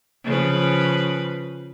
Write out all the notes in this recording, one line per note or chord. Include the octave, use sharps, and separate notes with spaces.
C#3 F3 B4